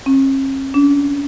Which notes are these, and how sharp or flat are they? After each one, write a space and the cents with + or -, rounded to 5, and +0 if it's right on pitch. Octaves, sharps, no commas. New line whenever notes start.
C#4 -45
C#4 +45